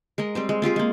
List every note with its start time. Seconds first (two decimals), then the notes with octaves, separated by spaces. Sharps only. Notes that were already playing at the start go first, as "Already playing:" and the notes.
0.18 G#3 A#4 D#5
0.35 G3 C4 C5
0.49 G#3
0.62 C4 F4 G4 G#4
0.76 G#3 A#3